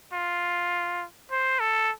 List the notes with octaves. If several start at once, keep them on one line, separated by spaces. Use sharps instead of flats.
F4
C5
A4